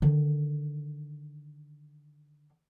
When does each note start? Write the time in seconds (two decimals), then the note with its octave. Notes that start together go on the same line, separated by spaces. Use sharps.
0.02 D3 D#3